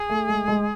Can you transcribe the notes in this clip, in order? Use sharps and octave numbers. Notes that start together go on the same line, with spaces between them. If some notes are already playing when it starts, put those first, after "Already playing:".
Already playing: G#4
A3
G#3
G#3